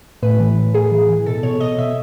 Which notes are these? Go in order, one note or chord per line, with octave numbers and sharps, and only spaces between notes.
A2 B4
E3
A2
A2 G#4
E3
E3
B2 A4
B2 C#5
B2 D#5
B2 E5